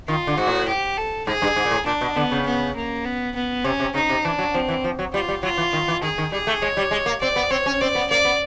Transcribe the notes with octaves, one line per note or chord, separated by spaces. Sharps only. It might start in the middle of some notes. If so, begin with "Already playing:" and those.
D#3 F4
D3
G#2 F#4
A2
G4
A4
G#2 G#4
G2
G#2
A#2
A2
A#2 D4
B2
D3 B3
C#3
B3
A#3
B3
B3
C3 C#4
C3
C#3 D#4
C3
E3 D4
F#3
F3 C4
E3
F3
F#3
G3 F4
G3
F#3 F4
E3
D#3
E3
D#3 G#4
D#3
G3 G#4
A3
G#3 C#5
G3
G#3
A#3
C4 D5
B3
C4 C#5
C#4
C4 D5
B3
A#3 D5
B3